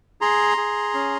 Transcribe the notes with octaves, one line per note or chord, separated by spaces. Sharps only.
G#4 A#5 C6
G#4
C#4